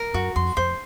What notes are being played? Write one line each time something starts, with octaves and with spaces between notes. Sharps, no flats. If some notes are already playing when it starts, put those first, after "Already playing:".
Already playing: A#4
F#2 F#4
F2 C6
F2 C5